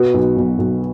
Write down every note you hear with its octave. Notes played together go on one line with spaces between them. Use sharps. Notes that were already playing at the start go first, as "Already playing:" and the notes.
Already playing: B2 F#4 B4
B1
B1
B1